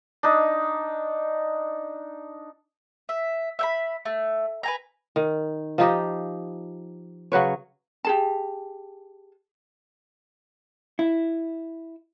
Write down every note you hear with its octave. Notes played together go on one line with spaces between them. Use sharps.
D4 D#4
E5
E5 G5 B5
A3
B4 G#5 A#5
D#3
F3 D#4 G4 D#5
C#3 F#3 B4 C#5
G4 G#4 A5
E4